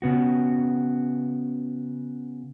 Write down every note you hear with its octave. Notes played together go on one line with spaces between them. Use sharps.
C#3 B3 F#4